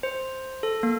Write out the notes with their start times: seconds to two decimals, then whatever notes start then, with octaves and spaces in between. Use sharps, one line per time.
0.03 C5
0.63 A4
0.83 A#3